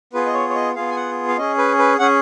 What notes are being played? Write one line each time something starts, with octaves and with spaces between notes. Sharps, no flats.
B3 F4 G#4 B4
D#5
C#5
C#5
D#5
B3 F4 G#4 F5
G#5
F#5
F5
C#4 G#4 D#5
B4
B4
C#4 G#4 F#5